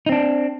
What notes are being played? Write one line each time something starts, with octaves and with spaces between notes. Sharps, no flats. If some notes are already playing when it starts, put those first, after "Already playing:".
C4 D4 D#4